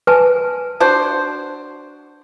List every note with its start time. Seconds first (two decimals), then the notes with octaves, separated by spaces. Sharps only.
0.07 B4 G#5 A5
0.80 D4 F#4 C5